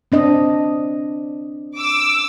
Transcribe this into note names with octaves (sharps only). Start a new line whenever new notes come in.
C4 D4 D#5
D6 E6